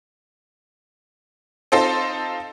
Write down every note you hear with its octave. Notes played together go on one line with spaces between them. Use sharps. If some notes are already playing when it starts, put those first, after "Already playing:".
C4 D#4 F4 A4 C5